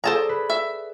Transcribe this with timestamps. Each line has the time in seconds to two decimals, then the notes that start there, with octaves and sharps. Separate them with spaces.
0.04 G#4 A4 C5 D5 A5 A#5
0.29 B4
0.50 E5